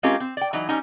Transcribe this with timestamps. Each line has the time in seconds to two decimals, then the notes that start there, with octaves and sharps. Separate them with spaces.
0.03 G#3 C4 C#4 F4 G4 A#4
0.20 C4
0.37 D5 G5
0.53 E3 F#3 D#4
0.69 G3 C#4 D#4